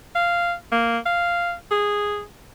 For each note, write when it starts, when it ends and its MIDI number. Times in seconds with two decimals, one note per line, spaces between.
0.15 0.54 77
0.72 0.98 58
1.06 1.53 77
1.71 2.22 68